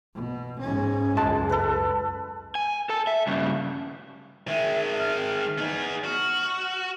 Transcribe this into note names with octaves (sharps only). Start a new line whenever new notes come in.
B2
G#2 C#4
C#2 F#2 G#3 A5
A4 B4
G#5
A4 A5
E5
G2 C#3
D#3 G#3 E5
F6
B3 D#4 G#4
F#4 F6